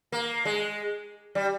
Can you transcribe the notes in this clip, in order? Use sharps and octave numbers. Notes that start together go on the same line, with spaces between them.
A#3
G#3
G3